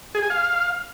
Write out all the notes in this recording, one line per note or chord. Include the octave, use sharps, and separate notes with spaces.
G#4
G#5
F5